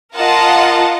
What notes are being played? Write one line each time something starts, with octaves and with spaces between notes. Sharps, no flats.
F4 A#4 D#5 F#5 A5